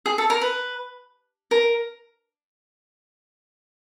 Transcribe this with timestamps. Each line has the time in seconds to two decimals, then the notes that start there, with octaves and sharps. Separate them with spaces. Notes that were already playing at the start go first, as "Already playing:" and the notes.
0.06 G#4
0.18 A4
0.30 A#4
0.41 B4
1.51 A#4